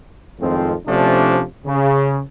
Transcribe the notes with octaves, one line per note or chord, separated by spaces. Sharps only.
F2 A2 D#3 F3 G#3 C4
C3 F3 A3 C#4 D4
C#3